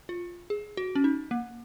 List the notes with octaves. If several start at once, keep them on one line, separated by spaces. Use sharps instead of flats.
F4
G#4
F#4
C#4
D#4
A#3